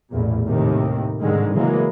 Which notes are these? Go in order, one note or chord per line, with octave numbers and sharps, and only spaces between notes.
A1 E2 A#2
D#2 A2 C3 D#3
C2 G#2 D3 D#3 G#3
C#3 E3 F#3 G#3 A#3